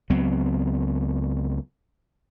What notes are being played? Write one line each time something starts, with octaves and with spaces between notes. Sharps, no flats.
C#2 F#3 B3 C4